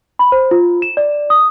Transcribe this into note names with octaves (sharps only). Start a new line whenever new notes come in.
B5
C5
F4
E7
D5
D#6